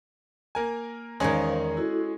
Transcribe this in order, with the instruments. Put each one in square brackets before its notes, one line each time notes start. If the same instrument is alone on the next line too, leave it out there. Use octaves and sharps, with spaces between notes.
[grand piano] A#3 A#4 G#5
[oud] E2 D#3 [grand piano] G#3 C#4 G#4 [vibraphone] C5 F5
[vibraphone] E4 F#4 A4